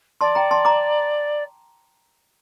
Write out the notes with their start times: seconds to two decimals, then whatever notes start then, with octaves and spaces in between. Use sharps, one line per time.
0.21 D5 A5 C6
0.35 G5 A#5
0.51 A5 C6
0.65 A#5 D6